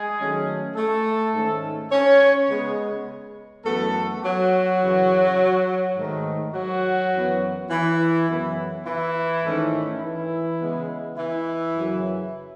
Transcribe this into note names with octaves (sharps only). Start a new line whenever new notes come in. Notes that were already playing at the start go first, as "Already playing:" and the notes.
Already playing: G#3 G#4
D#3 F#3 A3 C#4
A3 A4
G#2 D#3 A3 C#4
C#4 C#5
C#3 G#3 B3
F#2 E3 A3 B3 A4
F#3 F#4
F#2 C#3 E3
G#2 D#3 A3
F#3 F#4
F#2 E3 B3
E3 E4
F#2 C#3 E3 B3
E3 E4
G#2 D#3 A3 C#4
E3 E4
C#3 G#3 B3
E3 E4
F#2 C#3 F#3